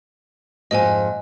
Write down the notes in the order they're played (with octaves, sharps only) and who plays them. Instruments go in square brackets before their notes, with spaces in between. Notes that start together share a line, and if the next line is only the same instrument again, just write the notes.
[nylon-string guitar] F2 G#2 [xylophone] D#5 G#5